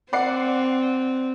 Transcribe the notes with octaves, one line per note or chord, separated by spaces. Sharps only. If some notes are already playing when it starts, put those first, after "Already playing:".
C4 D5 F#5 C7